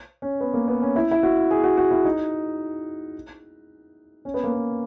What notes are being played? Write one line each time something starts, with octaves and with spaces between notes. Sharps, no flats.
C#4
B3
A#3
B3
C#4
E4
E4
F#4
G#4
F#4
F#4
E4
D#4
C#4
B3
A#3
B3